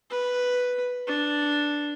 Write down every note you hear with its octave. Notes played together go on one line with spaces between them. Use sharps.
B4
D4